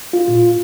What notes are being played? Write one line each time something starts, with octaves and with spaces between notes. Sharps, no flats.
F4
A#2